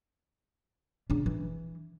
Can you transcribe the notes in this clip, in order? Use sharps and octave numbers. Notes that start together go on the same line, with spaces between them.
C#3 D4
E3